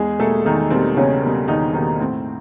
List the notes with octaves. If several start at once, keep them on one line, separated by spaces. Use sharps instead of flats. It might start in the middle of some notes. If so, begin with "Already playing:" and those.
Already playing: E2 G#3 G#4
B2 G3 A3 A#3 A4
E2 D#3 D#4
B2 G3 A#3 C4
E2 C#3 C#4
B2 G3 A#3
E2 D#3 D#4
B2 D#3 G3 A#3 D#4
A2 C4